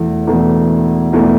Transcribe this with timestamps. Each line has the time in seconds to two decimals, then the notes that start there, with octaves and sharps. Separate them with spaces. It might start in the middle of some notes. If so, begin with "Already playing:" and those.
Already playing: E1 E2 E3 A3
0.27 E1 E2 E3 A3
1.13 E1 E2 E3 A3